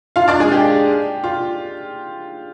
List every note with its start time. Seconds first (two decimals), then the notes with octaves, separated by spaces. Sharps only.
0.16 F4 F5
0.28 D4 D5
0.40 G#3 G#4
0.52 G4
1.24 F4